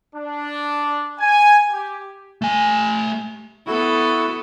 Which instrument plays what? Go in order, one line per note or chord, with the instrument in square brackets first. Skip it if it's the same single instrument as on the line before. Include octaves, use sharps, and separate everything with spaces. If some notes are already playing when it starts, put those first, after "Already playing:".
[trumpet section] D4
G#5
G4
[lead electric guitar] A3 G#5
[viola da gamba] B3 A4 [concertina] E4 F#4